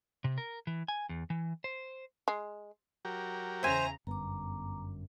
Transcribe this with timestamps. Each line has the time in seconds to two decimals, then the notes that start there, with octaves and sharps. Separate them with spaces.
0.24 C3
0.38 A#4
0.67 E3
0.88 G#5
1.09 E2
1.30 E3
1.64 C5
2.28 G#3
3.05 F#3 G4 A#4
3.63 E2 C#3 C5 E5 G#5 A#5
4.07 G1 F#2 B3 A#5 D6